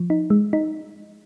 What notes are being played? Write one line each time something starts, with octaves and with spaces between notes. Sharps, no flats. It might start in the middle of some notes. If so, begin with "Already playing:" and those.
Already playing: F3
D#4
G#3
D#4